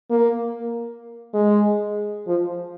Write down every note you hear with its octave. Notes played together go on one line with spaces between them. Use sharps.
A#3
G#3
F3